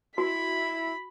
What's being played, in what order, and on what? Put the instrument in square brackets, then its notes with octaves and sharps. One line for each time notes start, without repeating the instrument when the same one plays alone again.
[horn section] E4 [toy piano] F#4 [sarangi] B5